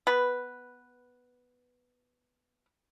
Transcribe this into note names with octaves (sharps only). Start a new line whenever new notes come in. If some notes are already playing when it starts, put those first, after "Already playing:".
B3 B4